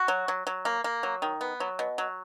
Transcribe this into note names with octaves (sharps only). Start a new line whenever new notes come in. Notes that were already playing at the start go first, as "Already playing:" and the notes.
Already playing: F#4
F#3
F#3
F#3
A#3
A#3
F#3
D#3
B3
F#3
B2
F#3